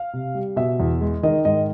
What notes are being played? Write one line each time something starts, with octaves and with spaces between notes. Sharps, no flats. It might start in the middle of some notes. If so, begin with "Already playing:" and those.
Already playing: F5
C3
G3
B2 E5
E2
G#3
D#3 D#5
G#2 D#5